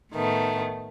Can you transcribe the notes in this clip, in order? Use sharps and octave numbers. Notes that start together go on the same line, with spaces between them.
A2 D#3 A3 B3